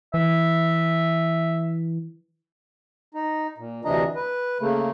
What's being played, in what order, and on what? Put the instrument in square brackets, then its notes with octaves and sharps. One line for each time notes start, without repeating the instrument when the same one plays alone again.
[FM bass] E3 [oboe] E5
[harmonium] D#4
A#2
D2 C3 E3 D4 D#5 A#5
B4
C#3 A3 A#3